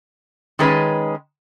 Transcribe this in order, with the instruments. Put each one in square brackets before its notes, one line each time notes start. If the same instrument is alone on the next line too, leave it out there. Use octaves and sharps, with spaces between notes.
[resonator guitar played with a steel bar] D#3 G#3 C#4 B4 D#5